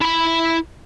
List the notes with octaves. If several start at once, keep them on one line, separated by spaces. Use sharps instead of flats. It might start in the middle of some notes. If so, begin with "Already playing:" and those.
E4 B5